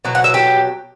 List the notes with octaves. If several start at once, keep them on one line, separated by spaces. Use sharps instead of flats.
B2 F#3
F#5
E5
G4